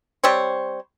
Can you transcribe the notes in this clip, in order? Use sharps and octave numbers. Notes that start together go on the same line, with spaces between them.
G3 C4 C5 C#5